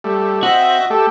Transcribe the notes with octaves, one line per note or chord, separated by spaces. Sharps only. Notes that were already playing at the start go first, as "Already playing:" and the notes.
G3 A3
C4 F#4 D#5 E5
A3 G4 A4